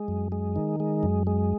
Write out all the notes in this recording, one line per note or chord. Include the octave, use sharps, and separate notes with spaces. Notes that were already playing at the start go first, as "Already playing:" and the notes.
Already playing: G#3
F#2
G#3
D#3
G#3
F#2
G#3